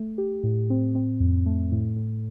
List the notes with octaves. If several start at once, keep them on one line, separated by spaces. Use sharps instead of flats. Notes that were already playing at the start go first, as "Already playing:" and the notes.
Already playing: A3
G4
A2
C4
C4
F2
A3
A2
A2